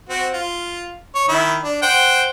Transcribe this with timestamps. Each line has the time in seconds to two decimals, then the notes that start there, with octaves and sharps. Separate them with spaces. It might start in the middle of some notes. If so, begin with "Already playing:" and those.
0.09 C4 F#4
0.33 F4
1.15 C#5
1.28 D#3 E4
1.63 D4
1.83 C5 F#5 G5